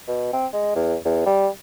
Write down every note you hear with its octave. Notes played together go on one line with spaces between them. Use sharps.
B2
C4
G#3
E2
E2
G3